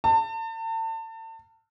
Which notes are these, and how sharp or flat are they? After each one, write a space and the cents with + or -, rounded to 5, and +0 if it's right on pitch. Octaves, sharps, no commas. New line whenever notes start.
A5 +35